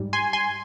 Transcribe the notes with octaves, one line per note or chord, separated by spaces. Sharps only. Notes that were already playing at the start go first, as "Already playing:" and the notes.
Already playing: G#2 G3
G#5 C6
G#5 C6